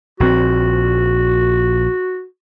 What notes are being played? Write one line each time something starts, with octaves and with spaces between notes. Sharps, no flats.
A#1 C4 F#4